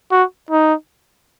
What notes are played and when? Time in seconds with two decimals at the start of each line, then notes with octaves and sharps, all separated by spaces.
0.11 F#4
0.51 D#4